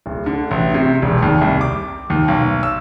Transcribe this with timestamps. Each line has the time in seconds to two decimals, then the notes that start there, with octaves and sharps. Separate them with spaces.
0.06 D1
0.26 D3
0.51 A1
0.74 C3
1.02 E1
1.22 D#2
1.41 C2
1.61 D6
2.10 D#2
2.28 B1
2.63 E6